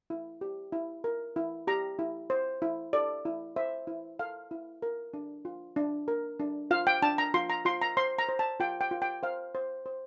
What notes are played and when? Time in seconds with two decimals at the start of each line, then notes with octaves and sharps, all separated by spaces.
0.10 E4
0.41 G4
0.72 E4
1.04 A#4
1.36 E4
1.67 G4 A#5
1.99 E4
2.30 C5
2.62 E4
2.93 A4 D5
3.25 E4
3.56 C5 E5
3.87 E4
4.19 A4 F5
4.51 E4
4.82 A#4
5.14 D4
5.45 F4
5.76 D4
6.08 A#4
6.40 D4
6.71 F4 F5
6.87 G5
7.02 D4 A5
7.18 A#5
7.34 F4 C6
7.50 A#5
7.65 F4 C6
7.81 A#5
7.97 C5 C6
8.19 A#5
8.29 C5
8.39 A5
8.60 F4 G5
8.81 G5
8.91 F4
9.02 G5
9.23 C5 F5
9.55 C5
9.86 C5